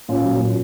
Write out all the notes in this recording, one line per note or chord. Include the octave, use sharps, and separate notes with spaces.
A#2 C#4 F4
F#3
A#2